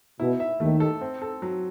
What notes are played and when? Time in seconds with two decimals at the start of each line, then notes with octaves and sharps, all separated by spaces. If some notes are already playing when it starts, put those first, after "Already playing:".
0.19 B2 E4
0.40 E5
0.60 D#2 D#3 A3
0.80 A4
1.01 C4
1.22 A4
1.42 F#3